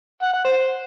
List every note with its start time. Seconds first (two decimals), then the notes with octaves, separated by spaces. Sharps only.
0.22 F#5
0.34 F#5
0.45 C5